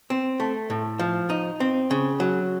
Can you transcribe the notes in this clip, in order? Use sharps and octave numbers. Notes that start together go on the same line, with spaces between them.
C4
A3
A2
F3
D#4
C4
C#3
F#3